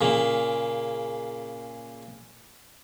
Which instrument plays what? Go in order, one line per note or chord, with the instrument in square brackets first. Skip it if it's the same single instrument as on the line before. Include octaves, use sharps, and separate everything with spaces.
[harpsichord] A#2 C#3 A#3